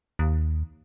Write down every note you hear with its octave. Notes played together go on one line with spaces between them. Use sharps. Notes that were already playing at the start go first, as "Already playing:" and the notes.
D#2